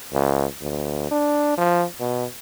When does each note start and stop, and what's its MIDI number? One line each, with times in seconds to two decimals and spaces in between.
0.13 0.45 37
0.61 1.11 38
1.11 1.57 62
1.58 1.84 53
2.00 2.25 47